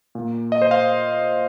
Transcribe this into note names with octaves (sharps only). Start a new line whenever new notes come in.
A#2 A#3
D#5
C5
F5